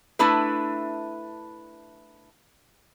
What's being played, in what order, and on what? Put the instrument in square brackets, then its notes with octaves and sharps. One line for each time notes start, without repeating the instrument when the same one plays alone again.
[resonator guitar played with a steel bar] A3 D4 E4 B4